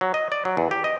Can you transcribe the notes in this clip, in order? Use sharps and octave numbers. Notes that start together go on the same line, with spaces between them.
F#3
D#5
D5
F#3
E2
G4
D#5